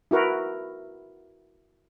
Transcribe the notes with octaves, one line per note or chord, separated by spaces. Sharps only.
E4 F#4 A#4 B4